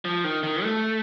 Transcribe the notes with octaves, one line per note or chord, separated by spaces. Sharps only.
F3
D#3
D#3
A3